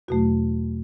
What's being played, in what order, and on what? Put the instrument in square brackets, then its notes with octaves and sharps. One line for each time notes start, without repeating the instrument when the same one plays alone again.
[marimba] E2 B2 F#3 A3 F#4